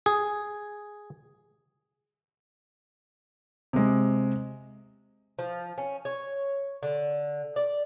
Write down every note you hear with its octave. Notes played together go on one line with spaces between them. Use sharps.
G#4
C3 G#3
F3
C#4
C#5
D3
D5